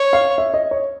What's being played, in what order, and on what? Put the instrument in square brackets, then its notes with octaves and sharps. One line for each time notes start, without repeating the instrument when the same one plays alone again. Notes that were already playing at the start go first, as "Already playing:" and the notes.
Already playing: [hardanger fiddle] C#5
[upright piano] F5
E5
D#5
C#5